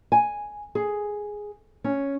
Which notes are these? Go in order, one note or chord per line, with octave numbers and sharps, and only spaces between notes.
G#5
G#4
C#4